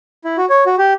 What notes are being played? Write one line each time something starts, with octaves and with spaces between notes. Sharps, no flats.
E4
F#4
C#5
F#4
G4